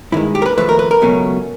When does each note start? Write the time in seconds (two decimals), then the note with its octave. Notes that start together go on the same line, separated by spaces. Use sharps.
0.12 G2 D#3 G#3 E4
0.35 G4
0.42 A#4
0.46 B4
0.58 D#2 C#3 F3 A3 B4
0.69 A#4
0.79 B4
0.91 A#4
1.01 C#2 B2 F#3 A3 C#4